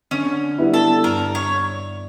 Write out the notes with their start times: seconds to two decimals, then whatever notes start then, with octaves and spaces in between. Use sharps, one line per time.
0.11 D3 C#4
0.58 G3 B3 E4
0.74 A4
1.04 G2 A#4
1.35 C#5